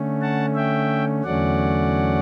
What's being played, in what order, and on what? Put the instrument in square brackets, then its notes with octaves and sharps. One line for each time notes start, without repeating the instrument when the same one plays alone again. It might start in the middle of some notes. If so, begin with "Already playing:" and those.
Already playing: [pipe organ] D3 A3 C#4
F#5 A5
E5 G5
E2 D3 F#3 A3 C#4 D5 F#5